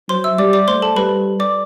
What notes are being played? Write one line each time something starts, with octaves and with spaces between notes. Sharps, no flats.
F#3 C5 C6
E5 E6
G3 D5 D6
D5 D6
A3 C5 C6
A4 A5
G3 B4 B5
D5 D6